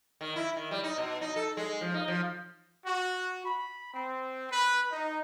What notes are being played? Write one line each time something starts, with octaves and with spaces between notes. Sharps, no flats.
D#3
E4
D#3
G3
D#4
B2
D#4
A4
G#3
F3
D#4
F3
F#4
B5
C4
B4
D#4